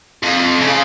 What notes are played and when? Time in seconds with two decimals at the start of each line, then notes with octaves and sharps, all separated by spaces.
0.23 F2
0.61 C#3